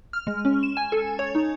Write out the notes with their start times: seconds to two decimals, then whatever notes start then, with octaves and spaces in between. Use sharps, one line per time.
0.13 F6
0.27 G#3
0.45 C#4
0.63 E7
0.77 G#5
0.92 A4
1.19 C#5
1.35 D#4